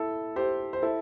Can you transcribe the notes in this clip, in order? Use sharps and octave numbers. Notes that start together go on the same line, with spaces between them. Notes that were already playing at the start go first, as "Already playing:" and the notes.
Already playing: E4 A4
G4 C5
C5
E4 A4